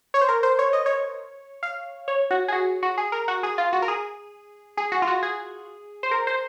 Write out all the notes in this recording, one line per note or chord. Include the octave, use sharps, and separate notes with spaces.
C#5
C5
A#4
C5
C#5
D#5
C#5
F5
C#5
F#4
G#4
F#4
F#4
G#4
A#4
F#4
G#4
F4
F#4
A#4
G#4
G#4
F#4
F4
F#4
G#4
C5
A#4
C5